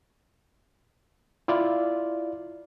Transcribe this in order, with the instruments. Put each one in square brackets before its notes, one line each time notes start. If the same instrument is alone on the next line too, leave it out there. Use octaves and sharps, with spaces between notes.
[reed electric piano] E4 F4 D5